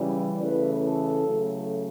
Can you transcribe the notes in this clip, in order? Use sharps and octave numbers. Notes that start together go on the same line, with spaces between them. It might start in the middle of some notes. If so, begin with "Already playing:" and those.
Already playing: C#3 E3 G3
C#3 E3 A3 B4
A4
C#3 F#3 A3